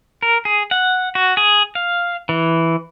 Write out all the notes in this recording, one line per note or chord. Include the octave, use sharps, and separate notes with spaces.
A#4
G#4
F#5
F#4
G#4
F5
E3